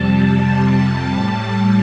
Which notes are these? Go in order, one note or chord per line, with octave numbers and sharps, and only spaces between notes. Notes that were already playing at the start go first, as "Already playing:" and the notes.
Already playing: F2 C3 G3 A5
A2 G3